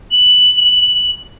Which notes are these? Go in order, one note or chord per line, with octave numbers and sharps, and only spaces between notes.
F#7